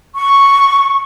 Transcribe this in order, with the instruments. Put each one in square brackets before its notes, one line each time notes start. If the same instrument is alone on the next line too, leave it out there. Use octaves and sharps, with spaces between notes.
[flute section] C#6